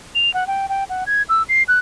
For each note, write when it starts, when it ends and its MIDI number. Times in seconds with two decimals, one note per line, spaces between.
0.15 0.33 101
0.34 0.47 78
0.47 0.69 79
0.69 0.84 79
0.89 1.04 78
1.06 1.22 92
1.29 1.42 88
1.49 1.63 96
1.68 1.79 90